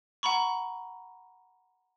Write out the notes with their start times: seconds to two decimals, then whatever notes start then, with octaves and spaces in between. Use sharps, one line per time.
0.23 F#5 A#5 B5 C#6